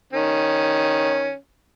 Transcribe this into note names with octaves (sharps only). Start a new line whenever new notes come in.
D#3 C#4